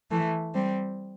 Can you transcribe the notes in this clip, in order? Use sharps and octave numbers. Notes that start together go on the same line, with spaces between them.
E3 A3
G3 C4